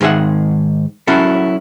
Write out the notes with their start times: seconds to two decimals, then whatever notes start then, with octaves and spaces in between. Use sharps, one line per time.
0.01 G#2 D#3 G#4 E5 F#5
1.07 F#3 C#4 E4 F#4 A4